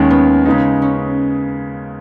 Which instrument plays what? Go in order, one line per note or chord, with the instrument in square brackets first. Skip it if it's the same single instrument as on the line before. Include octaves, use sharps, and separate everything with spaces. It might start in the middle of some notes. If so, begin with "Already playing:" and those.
Already playing: [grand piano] D#2 D#3 G#3 [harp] C#4
[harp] B3
[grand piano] C#3 G#3 D#4
[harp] C#4